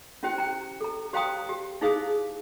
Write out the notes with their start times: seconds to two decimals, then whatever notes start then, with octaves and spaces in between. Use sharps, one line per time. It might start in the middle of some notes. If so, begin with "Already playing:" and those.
0.23 C#4 E4 G4 C5 G5
0.38 G5 A#5
0.81 A4 A#5
1.13 G4 C5 F5 G5 A#5 D#6
1.49 G4
1.81 D#4 E4 G#4 C5 F5 D#6